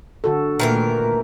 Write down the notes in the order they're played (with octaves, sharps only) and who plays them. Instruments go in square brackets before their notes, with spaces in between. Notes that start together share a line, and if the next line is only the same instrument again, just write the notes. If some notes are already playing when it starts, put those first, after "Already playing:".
[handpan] D3 F#4 A4
[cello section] A#2 A3 [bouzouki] D#3 E3 A#4